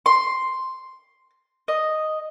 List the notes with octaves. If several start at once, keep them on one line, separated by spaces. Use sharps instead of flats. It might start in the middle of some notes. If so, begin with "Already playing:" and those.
C6
D#5